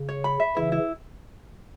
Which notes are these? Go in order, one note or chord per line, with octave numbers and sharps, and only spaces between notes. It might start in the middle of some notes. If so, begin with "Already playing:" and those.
Already playing: C#3
C#5
B5
E5
C#3 E3 E4
E4